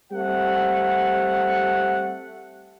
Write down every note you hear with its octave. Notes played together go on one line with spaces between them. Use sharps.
G3 A3 C4 F#5